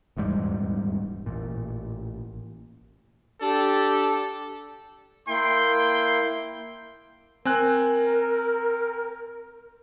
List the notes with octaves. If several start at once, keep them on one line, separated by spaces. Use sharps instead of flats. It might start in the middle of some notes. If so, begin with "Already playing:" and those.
D#1 E2 G#2 G3
A1 A#2
D4 G4 A4
A#3 E4 G5 C6
C4 A#4 G#5 F#6